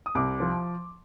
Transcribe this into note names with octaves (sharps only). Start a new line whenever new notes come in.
D#6
C2 D6
F3